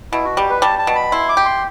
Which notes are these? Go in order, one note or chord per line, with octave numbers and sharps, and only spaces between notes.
B2 E4
F#4
G3 G4
B4
G3 A5
A5
B2
B5
E4 C6
D6
G4
C6